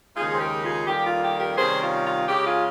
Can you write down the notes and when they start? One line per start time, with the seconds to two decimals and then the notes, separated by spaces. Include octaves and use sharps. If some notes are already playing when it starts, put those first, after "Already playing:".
0.16 D#2 C#3 G#3 D#4 F4 G#4
0.33 C5
0.40 G4 A#4
0.64 F4 G#4
0.87 F2 D#3 G3 A#3 G4
1.05 F4
1.22 G4
1.40 G4 A#4
1.57 C3 D#3 G3 C#4 G#4 C5
1.81 F4
2.05 F4
2.28 C#3 G#3 C#4 G4
2.46 F4 G#4